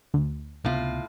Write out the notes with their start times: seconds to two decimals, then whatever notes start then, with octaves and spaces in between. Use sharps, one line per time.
0.14 D2
0.65 C#2 A2 C3 B3 F4